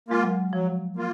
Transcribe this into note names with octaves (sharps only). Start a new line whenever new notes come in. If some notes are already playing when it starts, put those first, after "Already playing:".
G#3 A#3 F4
F#3
F3 F#3
A#3 F4